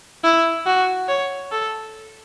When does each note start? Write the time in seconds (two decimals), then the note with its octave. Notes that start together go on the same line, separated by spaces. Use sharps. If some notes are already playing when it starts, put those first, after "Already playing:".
0.24 E4
0.66 F#4
1.08 C#5
1.52 A4